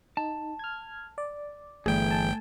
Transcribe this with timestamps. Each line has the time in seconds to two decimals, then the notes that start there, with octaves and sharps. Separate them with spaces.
0.17 D#4 A5
0.59 F6 G#6
1.18 D5
1.86 G1 E3 A3 G#4 G5
2.07 G#5 A5